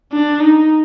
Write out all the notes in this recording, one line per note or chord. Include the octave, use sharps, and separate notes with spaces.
D4
D#4